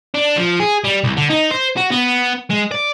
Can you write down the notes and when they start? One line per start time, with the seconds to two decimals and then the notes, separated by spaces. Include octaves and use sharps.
0.14 D4
0.37 F3
0.60 G#4
0.84 G3
1.04 C2
1.17 D3
1.30 D#4
1.51 C5
1.77 F#4
1.92 B3
2.50 G#3
2.72 D5